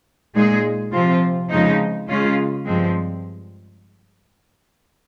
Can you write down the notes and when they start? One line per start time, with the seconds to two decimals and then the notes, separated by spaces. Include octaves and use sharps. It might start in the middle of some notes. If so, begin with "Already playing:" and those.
0.35 A#2 G#3 D#4 G#4
0.93 C3 F3 C4 F4
1.50 F2 C#3 F3 G#3 D#4
2.08 C#3 G#3 C#4 F4
2.66 G2 F3 G#3 C4